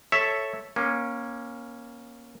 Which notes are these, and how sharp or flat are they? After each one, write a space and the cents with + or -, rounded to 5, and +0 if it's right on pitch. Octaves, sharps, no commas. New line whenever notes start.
A4 +0 C#5 +0 E5 +0
A#3 +20 C#4 -10